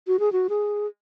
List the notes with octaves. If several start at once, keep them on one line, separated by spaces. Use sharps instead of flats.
F#4
G#4
F#4
G#4